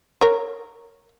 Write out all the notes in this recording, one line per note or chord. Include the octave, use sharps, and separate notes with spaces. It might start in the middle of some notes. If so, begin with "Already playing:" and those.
A#4 C#5